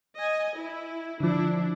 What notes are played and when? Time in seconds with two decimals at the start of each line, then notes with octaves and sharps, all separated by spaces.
0.16 D#5 G#5
0.56 E4
1.20 D3 F3 D4 E4